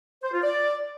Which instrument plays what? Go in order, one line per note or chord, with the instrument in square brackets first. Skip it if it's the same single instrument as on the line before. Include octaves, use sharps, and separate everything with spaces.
[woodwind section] C5
F4
D5